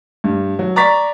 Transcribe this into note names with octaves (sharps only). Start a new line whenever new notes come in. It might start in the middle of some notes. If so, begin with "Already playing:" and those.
G2
F#3
D5 A#5 C#6 A6 B6